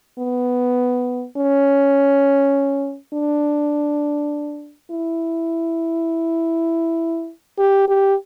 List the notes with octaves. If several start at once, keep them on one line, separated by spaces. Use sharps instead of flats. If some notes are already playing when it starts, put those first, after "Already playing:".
B3
C#4
D4
E4
G4
G4